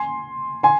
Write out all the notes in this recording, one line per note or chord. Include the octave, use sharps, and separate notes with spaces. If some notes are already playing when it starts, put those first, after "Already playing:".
Already playing: G#5 C6
G#5 C6